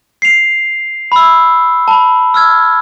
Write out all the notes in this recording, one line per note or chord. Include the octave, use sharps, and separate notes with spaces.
C7 F7
B5 E6
A5 B5
E6 F6 G#6